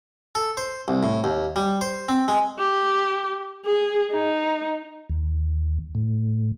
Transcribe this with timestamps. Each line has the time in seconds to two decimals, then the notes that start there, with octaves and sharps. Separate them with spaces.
0.35 A4
0.57 C5
0.88 C2
1.03 A2
1.24 D#2
1.56 G3
1.81 C5
2.09 C4
2.28 G#3
2.59 G4
3.66 G#4
4.12 D#4
5.10 D#2
5.95 A2